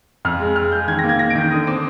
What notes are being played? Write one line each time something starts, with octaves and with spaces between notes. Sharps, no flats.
F2 F6
G#3
G#3 F6
G#3 G6
D#3 G#6
A#6
A#3
G#6
A#3 A#6
D7
D#3
G6
D3 D#6
C4 D6